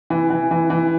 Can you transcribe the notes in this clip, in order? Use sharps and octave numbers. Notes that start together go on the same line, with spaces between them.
E3
E3
E3
E3